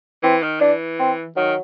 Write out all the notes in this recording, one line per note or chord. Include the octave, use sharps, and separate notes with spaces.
E3 C4
D#3
E3 D4
C4
D#3 F#3